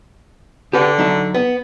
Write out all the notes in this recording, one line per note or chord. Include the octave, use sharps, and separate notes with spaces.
D3 G4 B4 F#5
F#3 D#4 E5
B3